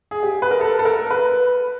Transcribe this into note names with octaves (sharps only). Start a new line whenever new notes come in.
G#4
G4
B4
A#4
A4
A4
A#4
B4